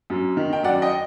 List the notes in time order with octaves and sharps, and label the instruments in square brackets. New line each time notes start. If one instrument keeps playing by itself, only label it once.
[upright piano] F#2
D#3
G5
F#2 D5 F#5
D#5 G5